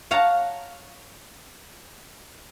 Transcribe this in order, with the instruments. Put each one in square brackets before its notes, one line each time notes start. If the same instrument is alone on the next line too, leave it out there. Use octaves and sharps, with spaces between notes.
[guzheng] C#5 F5 F#5 A5 A#5